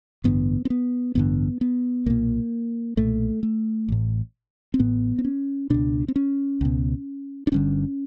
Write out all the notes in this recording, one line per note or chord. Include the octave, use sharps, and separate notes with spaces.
A1 G2 D3 B3
C4
B3
A1 G2 D3 B3
B3
B1 A#2 A#3
B1 A#2 A3
A3
A1 A2
C4
A1 A2 B3
C4
C#4
C#2 B2 D4
C4
C#4
C#2 B2
D4
G1 G2 D3 C#4